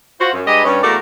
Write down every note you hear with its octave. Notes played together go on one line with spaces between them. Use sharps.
F4 F#4 C5
F#2
G2 G#3 G4 B4 D#5
G2 C#4
E2 A3 A#3 F#4 A#4 D5